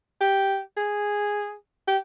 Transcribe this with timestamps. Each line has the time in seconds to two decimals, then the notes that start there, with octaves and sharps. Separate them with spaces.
0.21 G4
0.77 G#4
1.88 G4